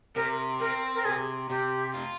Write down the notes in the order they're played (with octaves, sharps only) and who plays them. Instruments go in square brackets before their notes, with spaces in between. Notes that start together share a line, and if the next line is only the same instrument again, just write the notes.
[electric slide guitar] C3 [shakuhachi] A#4
[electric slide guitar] C4 [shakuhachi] A#4
[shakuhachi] A#4
[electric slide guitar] C3 [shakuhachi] G#4
[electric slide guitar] C3 [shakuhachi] G4
[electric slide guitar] F4